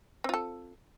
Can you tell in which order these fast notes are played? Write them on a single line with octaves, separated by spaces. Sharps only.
C4 F4 A4